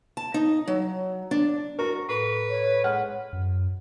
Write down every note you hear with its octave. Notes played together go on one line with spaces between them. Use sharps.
A5
D#4
F#3
D4
F#4 A#4
A2 B4
C#5
G#3 F#5 F6
F#2